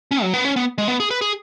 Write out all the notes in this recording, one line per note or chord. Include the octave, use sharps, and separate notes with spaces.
C#4
F#3
B3
C#4
B3
G#3
B3
G#4
B4
G#4